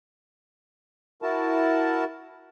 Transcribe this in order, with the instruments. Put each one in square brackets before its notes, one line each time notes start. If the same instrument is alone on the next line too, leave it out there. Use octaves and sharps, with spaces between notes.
[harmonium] E4 F#4 A#4 A5